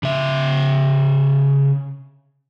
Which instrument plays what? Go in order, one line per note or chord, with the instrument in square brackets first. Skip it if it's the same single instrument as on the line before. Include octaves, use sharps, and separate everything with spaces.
[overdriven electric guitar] C#3 E5